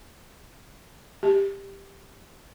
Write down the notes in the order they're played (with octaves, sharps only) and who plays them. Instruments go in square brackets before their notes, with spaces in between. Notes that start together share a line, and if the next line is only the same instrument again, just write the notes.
[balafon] G4